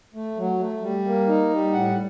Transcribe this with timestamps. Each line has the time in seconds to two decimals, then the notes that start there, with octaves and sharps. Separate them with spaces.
0.14 A3
0.37 F#3
0.59 A3
0.82 G3
1.05 A#3
1.27 D#4
1.50 G3
1.72 A2 F#5